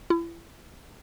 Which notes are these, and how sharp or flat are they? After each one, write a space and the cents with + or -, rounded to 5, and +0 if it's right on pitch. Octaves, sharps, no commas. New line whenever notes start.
E4 +35